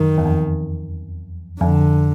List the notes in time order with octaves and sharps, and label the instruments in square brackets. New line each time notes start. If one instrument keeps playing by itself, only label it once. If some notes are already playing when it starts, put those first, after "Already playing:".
Already playing: [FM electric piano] F#2 [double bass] D#3
[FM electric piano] E2
F2
[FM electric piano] F2 [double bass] D3